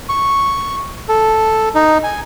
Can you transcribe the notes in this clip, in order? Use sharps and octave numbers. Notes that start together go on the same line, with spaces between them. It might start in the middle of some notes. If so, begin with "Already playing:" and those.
C#6
A4
D#4
G#5